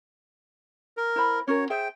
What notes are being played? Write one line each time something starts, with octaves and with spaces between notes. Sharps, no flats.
A#4
E4 C5 B5
C#4 F#4 A#4 C#5
G#4 C5 E5 G5